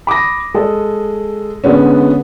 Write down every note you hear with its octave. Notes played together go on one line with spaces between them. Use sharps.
B5 D6 D#6 A#6
G#3 A4 D#5
D3 G#3 B3 C#4